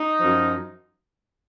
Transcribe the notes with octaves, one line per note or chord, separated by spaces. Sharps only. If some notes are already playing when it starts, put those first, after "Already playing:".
Already playing: D#4
F#2 F3